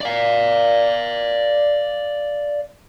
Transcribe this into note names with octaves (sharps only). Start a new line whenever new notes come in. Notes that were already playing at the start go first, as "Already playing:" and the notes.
D5 F5